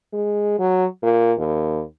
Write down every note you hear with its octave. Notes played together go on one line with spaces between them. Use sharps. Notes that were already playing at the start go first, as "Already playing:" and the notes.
G#3
F#3
A#2
D#2